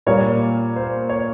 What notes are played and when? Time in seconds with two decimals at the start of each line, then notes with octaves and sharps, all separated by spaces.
0.06 A#2 G3 A#3 C#5
0.76 C5
1.09 C#5